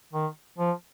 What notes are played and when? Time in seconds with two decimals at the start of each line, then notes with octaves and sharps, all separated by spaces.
0.13 D#3
0.58 F3